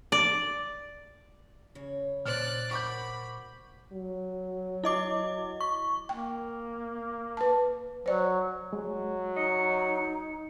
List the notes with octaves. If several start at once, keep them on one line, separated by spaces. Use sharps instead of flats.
D5
C#3 C#5
A#2 C5 D5 F6 F#6
F#4 A#4 B5 C#6 D6 G6
F#3
E4 D#5 D6
C#6
A#3 G5
B4 A5
F#3 C5 D5
F#3 G#3
D#4 D#5 C#7